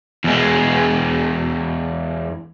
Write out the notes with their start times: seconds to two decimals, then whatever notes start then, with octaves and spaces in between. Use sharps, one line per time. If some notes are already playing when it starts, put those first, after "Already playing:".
0.24 E2 G#3